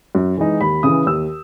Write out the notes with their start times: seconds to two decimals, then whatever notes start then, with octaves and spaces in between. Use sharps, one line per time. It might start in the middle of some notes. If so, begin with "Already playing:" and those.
0.15 F#2
0.37 E3 G#3 D#4
0.61 D#2 B5
0.83 C#3 E3 D#6
1.06 D#2 E6